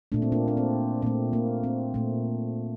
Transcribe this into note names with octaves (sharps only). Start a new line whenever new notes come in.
A#2 A3 D4
C4
A#3 D4
D4
C4
A#2 A3 C4
A#3
C4
A#2 A3